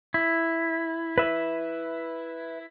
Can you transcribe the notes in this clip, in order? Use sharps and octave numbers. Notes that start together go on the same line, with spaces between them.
E4
B4 E5